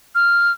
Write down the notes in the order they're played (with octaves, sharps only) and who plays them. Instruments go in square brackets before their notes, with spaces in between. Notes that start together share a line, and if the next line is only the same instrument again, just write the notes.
[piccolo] F6